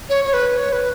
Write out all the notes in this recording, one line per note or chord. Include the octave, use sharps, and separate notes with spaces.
C#5
C#5
B4
C#5
B4